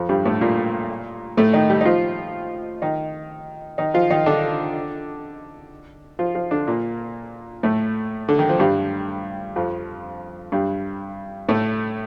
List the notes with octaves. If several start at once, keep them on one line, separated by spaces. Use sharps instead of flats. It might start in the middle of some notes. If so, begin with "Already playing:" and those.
Already playing: F2 F3
G2 G3
A2 A3
A#2 A#3
A2 A3
D#3 D#4
G3 G4
D#4
F3 F4
D#3 D#4
D#3 D#4
F3 F4
D#3 D#4
D3 D4
F3 F4
F3 F4
D3 D4
A#2 A#3
A2 A3
D3
D#3
F3
G2 G3
F2 F3
G2 G3
A2 A3